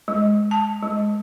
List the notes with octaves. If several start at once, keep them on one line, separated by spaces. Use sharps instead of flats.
G#3
A5
G#3